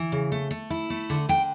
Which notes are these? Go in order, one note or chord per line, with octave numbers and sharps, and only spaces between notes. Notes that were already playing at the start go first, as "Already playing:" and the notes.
Already playing: E3
C#3
A3
A3
E4
A3
D3
D3 G5